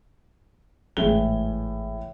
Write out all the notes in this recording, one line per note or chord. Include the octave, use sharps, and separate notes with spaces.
G#1 A2 E3 G#3 G#4 G7